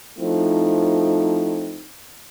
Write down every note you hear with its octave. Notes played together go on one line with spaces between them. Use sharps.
F3 A3 C4 D#4 E4